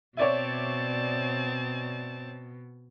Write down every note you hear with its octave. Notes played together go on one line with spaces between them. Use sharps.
B2 C4 C#5 D5 E5 A5